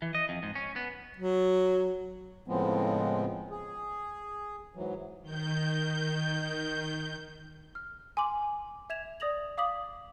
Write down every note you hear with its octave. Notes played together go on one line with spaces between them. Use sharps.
E3
D#5
F2
G#2
C#4
B3
F#3
A2 C#3 F3 G#3 B3 C4
G#4
G#2 E3 F#3
D#3 G6
F6
G#5 C6 D6 F#7
E5 G#6 E7 F7
D5 D#6 A#6 F7 F#7
F5 D6 D#6 B6 F#7